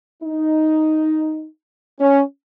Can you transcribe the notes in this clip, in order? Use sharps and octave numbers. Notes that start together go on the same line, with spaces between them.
D#4
C#4